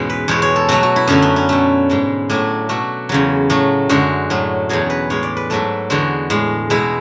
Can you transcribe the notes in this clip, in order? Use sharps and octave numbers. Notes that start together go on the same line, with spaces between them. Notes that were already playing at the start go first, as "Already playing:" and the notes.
Already playing: E2 G#2 B2 G#3 C#4
B4
E2 B2 G#3 C#5
C#5
A4
B2 F#3 A3 F#4
F#4
E4
F#2 D3 A3 C#4
B3
C#4
B2 A3
G#2 G#3
A2 F#3 A3 D4
B2 A3 F#4
E2 C#3 F#3
A2 F#3 A3
F#2 D3 G#3 F#4
A2 F#3 A3
E2 B2 F#3 G#4
B4
A2 G#3 C#5
D5
B4
G#2 F#3 A3 A4
E2 D3 G#3 F#4
A2 G#3
B2 G#3 E4